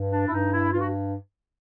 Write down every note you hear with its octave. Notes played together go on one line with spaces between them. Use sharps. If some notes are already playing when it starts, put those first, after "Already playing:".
Already playing: G2
D4
E4
G2 D#4
E4
G2 F4
F#4